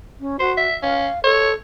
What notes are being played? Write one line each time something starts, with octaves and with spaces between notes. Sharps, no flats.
C#4
F#4 C5
E5
C#4 F5
A4 C#5